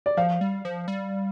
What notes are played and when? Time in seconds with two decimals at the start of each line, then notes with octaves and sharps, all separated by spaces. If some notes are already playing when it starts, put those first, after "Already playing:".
0.06 D5
0.17 F3 F5
0.41 G3
0.65 F3
0.88 G3